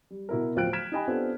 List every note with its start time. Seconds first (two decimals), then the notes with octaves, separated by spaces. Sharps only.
0.10 G3
0.29 B2 E4 A#4
0.56 D1 F3 F4 G5 F#6 D7
0.73 F6 G#6 B6 D7 E7
0.92 D#4 G4 D#5 G5 G#5 B5
1.07 B3 C4 D4 F4 G4 A4